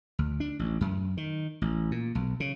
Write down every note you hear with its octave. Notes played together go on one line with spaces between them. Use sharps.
D2
D4
A1
F#2
D#3
A1
A#2
B1
C#3